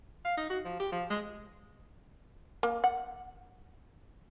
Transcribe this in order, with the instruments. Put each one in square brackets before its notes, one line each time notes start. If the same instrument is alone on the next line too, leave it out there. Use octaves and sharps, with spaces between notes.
[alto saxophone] F5
D#4
F#4
F3
G4
F3
G#3
[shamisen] A#3
F#5